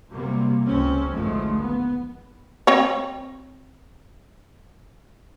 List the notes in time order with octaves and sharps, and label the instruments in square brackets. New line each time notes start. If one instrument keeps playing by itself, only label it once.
[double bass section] C3 F#3 G3 A#3
C#2 C4 C#4
A1 D2 D#3 F3 G#3 A3
B3
[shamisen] C4 C#5